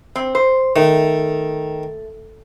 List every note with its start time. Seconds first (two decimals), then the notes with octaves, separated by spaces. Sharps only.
0.16 C4
0.35 C5
0.76 D#3 A3